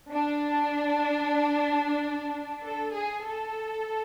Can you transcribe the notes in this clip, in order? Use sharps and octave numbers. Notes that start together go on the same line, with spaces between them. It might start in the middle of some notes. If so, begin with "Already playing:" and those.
D4
A4
G#4
A4